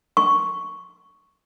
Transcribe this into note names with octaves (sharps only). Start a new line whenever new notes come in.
C#6